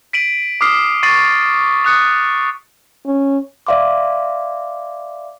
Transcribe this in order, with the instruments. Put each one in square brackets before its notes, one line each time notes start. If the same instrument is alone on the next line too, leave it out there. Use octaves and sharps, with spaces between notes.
[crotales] B6 D7 D#7 F#7
D6 D#6 F6 C7
C#6 A6 C7 D#7 F#7
D#6 F#6 C#7
[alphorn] C#4
[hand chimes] D5 E5 F5 C6 D6